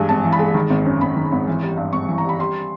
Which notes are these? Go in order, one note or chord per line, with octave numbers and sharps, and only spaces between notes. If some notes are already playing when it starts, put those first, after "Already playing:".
Already playing: G2 E3 G#3 G#5
G#1 A5
E3
B5
G#3
D#3
G#1
F#2
G#1 B5
D#3
G#1
E3
G3
G2
G#1 C#6
E3
A#5
G3 B5
G3 C6